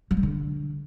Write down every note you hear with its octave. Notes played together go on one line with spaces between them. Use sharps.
F#3
G3
D3